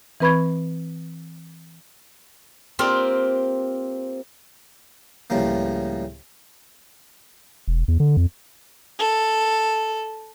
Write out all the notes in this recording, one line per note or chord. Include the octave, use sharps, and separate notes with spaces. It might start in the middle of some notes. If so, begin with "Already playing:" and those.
E3 C4 B4 B5 C#6 G#6
A#3 C4 F4 G4 A#4
C#2 A2 F3 G3 A#3
E1
E2
D3
F2
A4